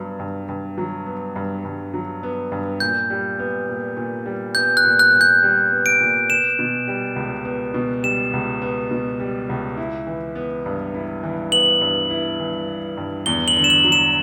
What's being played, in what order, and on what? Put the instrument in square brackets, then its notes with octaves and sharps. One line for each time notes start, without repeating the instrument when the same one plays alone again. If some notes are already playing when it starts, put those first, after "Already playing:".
Already playing: [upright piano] G2 F#3 B3
G2
G2
F#3
B3
G2
G2
F#3
B3
G2
[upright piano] A#2 [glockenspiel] G6
[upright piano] G3
B3
A#2
A#2
G3
[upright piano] B3 [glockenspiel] G6
[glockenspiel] F#6
[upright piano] A#2
[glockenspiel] F#6
[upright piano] A#2
[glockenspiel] G6
[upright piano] G3
B3
[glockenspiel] D7
[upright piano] A#2
[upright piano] B3 [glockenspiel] E7
[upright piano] B2
G3
C#2
B3
B2
[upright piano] G3 [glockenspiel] E7
[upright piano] C#2
B3
B2
G3
C#2
E4
E3
B3
G2
E4
E3
[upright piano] B3 [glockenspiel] F#7
[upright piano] G2
E4
E3
B3
G2
[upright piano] E2 [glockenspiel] G7
[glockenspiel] F#7
[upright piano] D3
[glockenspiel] E7
F#7
[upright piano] F#3
[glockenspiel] E7